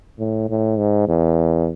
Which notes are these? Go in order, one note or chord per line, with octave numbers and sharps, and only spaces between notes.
A2
A2
G#2
E2